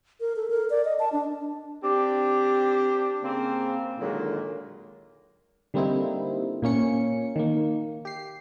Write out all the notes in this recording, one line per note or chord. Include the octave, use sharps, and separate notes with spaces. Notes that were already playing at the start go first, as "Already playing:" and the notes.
A#4
A4
A#4
D5
D#5
A5
D4
C4 D4 G4
C#3 A#3 C4
A#2 D3 D#3 F#3 G#3
D3 G3 A#3 C4 D#4 E4
A#2 A#3 C#4 C#7
D#3 A#3
G4 C7